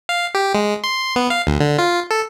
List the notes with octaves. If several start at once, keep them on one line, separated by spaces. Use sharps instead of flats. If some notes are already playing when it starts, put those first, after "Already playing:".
F5
G4
G#3
C6
B3
F5
D2
D3
F4
A4